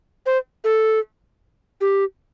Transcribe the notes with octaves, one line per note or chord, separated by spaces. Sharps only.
C5
A4
G4